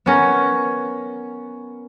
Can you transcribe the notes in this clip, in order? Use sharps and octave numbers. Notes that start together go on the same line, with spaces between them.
B3 C#4 A#4